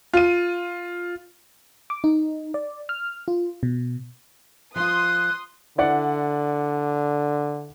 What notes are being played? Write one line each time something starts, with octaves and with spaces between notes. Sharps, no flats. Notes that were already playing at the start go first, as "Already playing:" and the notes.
F4 D#7
D6
D#4
D5
F6
F4
B2
F3 F4 C6 D#6 F#6
D3 E4 D5 F#5